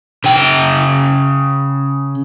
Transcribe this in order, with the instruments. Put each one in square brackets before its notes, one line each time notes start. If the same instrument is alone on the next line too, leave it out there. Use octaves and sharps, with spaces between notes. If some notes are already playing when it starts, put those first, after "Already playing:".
[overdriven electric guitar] C#3 G5